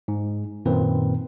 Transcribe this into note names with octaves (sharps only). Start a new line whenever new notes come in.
G#2
F#2 A#2 D#3 C4 B4